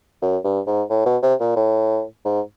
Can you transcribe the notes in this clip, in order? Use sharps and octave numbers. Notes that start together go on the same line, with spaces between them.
F#2
G2
G#2
A2
B2
C3
A#2
A2
G#2